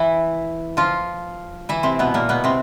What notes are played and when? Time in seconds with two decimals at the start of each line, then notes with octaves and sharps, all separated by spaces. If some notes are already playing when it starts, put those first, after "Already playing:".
Already playing: E3 E4
0.77 F3 F4
1.69 E3 E4
1.83 C3 C4
1.99 B2 B3
2.14 A#2 A#3
2.29 B2 B3
2.44 C3 C4